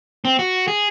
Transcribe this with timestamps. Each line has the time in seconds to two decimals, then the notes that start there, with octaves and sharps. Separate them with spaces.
0.25 C4
0.39 F#4
0.68 G#4